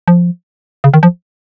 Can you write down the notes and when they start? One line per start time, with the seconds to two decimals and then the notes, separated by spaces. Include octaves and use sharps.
0.08 F3
0.84 C#3
0.94 D#3
1.03 F3